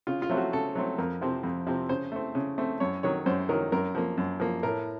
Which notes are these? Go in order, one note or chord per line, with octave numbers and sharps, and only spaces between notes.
C#3 F4
F4
F#3 A3 C4
F#4
C#3 A4
F#3 A3 C4
F2 A#4
C3 F3 C4
F2
C3 F3 C4
C#3 C5
A3 C4
C#3
A3 C4
F#2 C#5
D#3 F#3 C#5
F#2 C5
D#3 F#3 A#4
F#2 A#4
F3 A#3
F#2
F3 A#3
A2 A#4